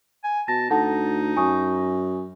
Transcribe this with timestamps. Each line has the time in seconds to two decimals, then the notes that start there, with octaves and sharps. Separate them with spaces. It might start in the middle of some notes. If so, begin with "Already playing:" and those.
0.24 G#5
0.48 B2 A5 A#6
0.71 D2 D#4 A4 F#5 A5
1.37 F#2 G#5 C#6 D#6